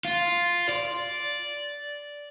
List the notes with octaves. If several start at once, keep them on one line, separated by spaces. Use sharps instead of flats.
F4
D5